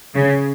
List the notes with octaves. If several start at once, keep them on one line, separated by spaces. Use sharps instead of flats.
C#3